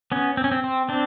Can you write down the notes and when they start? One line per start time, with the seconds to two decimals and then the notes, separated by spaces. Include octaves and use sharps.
0.12 B3 C#4
0.37 C4
0.44 C#4
0.52 C4
0.64 C4
0.89 C4 D4